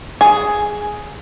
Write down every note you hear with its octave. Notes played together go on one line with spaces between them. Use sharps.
G#4